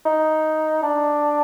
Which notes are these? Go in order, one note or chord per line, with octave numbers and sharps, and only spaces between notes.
D#4
D4